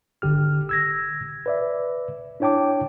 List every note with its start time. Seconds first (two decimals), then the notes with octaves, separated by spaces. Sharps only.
0.22 G#1 D3 G4 F6
0.69 E6 G#6 A#6
1.46 B4 D5 E5
2.40 D4 E4 C#5 G5 A5 D6